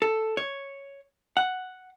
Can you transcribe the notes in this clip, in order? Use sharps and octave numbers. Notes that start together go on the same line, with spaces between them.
A4
C#5
F#5